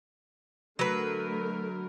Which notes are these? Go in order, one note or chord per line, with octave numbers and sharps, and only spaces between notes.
D3 F#3 A3 A#4 B4